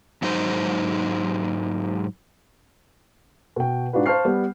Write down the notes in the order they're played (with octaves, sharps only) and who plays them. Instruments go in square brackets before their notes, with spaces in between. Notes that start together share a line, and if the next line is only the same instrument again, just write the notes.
[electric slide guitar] G#2 F#3 D#4 C5
[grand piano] B2 G5
G#2 D4 F4 F#4 B4
C5 F5 A5 C#6 F6 C7
G3 B3